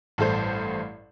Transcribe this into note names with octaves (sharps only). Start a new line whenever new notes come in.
A1 G2 A4 C5